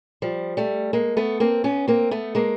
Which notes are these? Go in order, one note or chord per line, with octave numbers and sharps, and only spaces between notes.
F3 G3
G3 A3
G#3 A#3
A3 B3
A#3 C4
B3 C#4
A#3 C4
A3 B3
G#3 A#3